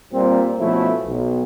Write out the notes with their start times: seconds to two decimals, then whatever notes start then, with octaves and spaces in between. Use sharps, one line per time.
0.13 A#2 G3 A#3 C4
0.59 B2 F3 A3 C#4 E4
1.06 B1